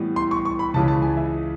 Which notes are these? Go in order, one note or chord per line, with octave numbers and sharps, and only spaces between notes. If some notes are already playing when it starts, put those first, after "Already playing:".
Already playing: A2 E3 G3 B3
C6
C#6
C#6
B5
C#2 C#3 E3 A5
A5
G#5
E5